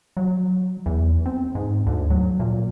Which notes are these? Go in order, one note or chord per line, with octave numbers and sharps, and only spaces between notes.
F#3
E2
C4
G#2
D2
F#3
A#2